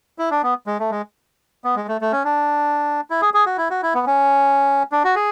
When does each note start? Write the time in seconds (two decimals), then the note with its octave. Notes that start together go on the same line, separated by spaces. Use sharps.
0.19 E4
0.31 D4
0.43 B3
0.67 G#3
0.80 A3
0.91 G#3
1.64 B3
1.76 G#3
1.88 A3
2.01 A3
2.12 C#4
2.24 D4
3.10 E4
3.22 G#4
3.34 G#4
3.46 F#4
3.58 E4
3.70 F#4
3.83 E4
3.94 B3
4.07 C#4
4.92 D4
5.04 F#4
5.16 G#4